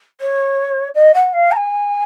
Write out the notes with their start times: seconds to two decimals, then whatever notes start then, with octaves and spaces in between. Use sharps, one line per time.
0.21 C#5
0.95 D#5
1.14 F#5
1.33 F5
1.51 A#5
1.56 G#5